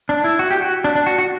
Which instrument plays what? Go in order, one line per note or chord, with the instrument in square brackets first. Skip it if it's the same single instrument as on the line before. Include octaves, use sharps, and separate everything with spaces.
[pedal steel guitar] D4
E4
F#4
G4
F#4
D4
D4
F#4
F#4